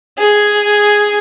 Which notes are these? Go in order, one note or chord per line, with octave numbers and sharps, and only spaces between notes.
G#4